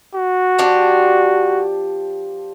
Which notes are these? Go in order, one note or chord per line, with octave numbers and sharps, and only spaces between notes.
F#4
F3 D4 G4